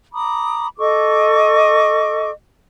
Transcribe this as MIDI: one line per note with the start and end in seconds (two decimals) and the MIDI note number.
0.13 0.68 82
0.13 0.68 83
0.13 0.68 86
0.13 0.68 87
0.77 2.30 69
0.77 2.30 75
0.77 2.30 85
0.77 2.30 86